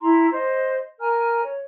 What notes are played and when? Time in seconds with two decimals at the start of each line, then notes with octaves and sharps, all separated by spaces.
0.02 E4 A#5 C6
0.32 C5 D#5
1.00 A#4 G#5 A#5 F6
1.44 C#5